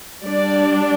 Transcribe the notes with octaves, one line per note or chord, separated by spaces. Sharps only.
G3 D4 D5